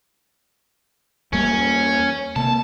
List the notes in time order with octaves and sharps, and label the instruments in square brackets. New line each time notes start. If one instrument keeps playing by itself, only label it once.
[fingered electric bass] E2 G3 A#3 [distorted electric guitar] C#4
[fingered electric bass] C3 A#3 [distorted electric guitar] A5